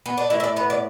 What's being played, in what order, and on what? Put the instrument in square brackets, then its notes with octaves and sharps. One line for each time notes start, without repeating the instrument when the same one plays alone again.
[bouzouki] B3
D4
A2 E4
E5
D5
B3 B4
D5